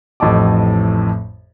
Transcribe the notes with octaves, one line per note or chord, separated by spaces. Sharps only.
A1 F2 A2 D#5 A5 D6